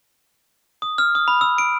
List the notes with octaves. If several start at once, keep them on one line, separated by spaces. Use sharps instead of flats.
D#6
F6
D#6
B5
E6
D7